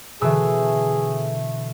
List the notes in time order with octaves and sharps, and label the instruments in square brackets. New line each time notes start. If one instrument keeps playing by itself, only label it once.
[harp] B2 D3 E3 [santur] A3 E6 [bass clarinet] G#4